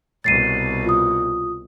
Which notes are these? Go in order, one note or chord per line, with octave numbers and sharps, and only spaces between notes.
C2 B2 A6 C7 D#7
F4 D#6